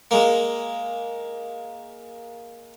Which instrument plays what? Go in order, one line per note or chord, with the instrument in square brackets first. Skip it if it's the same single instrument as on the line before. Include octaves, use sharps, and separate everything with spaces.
[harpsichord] G#3 A#3